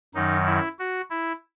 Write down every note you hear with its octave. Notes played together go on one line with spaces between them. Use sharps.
F#2 D#3 F#3 D#4
E4
F#4
E4